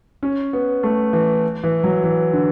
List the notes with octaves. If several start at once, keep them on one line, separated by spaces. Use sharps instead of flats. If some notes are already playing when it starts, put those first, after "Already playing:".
C#4
B3
A3
E3
E3
F#3
E3
D3